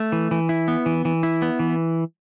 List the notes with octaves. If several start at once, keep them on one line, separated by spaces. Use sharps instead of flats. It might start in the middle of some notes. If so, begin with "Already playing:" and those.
Already playing: A3
E3
E3
E4
B3
E3
E3
E4
B3
E3